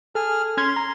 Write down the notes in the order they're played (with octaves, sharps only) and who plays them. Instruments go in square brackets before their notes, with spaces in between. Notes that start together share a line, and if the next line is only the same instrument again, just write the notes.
[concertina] G#4 F6 [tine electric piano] A4
[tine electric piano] C#4 F6 G#6 [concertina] C6
[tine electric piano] A#5